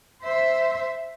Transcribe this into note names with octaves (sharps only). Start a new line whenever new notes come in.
C5 E5